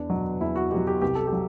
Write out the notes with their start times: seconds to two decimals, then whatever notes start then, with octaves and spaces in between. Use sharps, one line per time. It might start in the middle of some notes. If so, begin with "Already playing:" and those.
Already playing: E2 D4
0.10 B2 F#3
0.41 E2 E4
0.56 F#4
0.71 B2 F#3 G4
0.87 G4
1.02 C2 G4
1.15 A4
1.27 G4
1.32 F#3